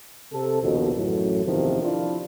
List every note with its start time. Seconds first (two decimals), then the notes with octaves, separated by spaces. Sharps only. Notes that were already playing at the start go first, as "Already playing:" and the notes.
0.32 C3 A4
0.62 A#1 D#2 B2
0.95 A1 F#2 A2
1.45 E2 C3 D#3 F3
1.82 F3 D4 E4 F4